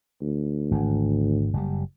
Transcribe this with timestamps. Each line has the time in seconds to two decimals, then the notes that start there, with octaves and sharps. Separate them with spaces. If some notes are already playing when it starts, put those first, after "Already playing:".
0.21 D2
0.71 G#1
1.53 F#1 G3